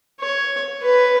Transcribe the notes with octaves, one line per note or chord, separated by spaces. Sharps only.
C#5
B4